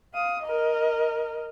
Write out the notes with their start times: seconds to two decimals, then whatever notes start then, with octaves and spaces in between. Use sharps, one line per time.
0.14 F5 D#6
0.43 A#4 D#5